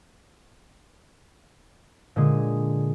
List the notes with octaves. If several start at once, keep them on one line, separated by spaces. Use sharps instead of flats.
A#2 D3 G#3 G#4